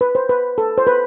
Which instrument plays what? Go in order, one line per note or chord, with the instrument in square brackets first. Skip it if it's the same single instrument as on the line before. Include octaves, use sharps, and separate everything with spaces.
[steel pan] B4
C5
B4
A4
C5
B4